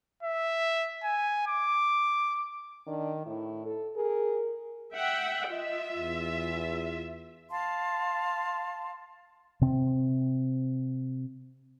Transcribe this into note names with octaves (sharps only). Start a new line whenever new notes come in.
E5
G#5
D6
D#3 D4
A2 E4
A4
G#4 A#4
E5 F#5 G5
F4 D#5 E5
E2
F5 A5 C6
C3 C4